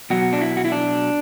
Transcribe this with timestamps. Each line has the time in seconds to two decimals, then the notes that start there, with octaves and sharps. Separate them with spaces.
0.10 B2 F#3 F#4
0.33 D4
0.41 E4
0.57 F#4
0.65 E4
0.72 D4